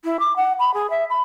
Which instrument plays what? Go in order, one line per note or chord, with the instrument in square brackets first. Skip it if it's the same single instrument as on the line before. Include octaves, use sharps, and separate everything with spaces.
[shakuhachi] E4
D6
F#5
B5
G#4
E5
B5